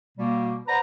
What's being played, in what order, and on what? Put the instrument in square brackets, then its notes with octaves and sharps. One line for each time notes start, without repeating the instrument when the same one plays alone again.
[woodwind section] B2 G3 A#3
B4 C5 D5 F#5 A#5